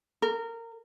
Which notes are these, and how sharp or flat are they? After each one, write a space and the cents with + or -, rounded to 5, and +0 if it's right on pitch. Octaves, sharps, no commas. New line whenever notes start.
A#4 -20